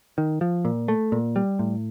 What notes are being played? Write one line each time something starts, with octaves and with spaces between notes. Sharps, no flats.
D#3
F3
A#2
A3
A#2
G3
A2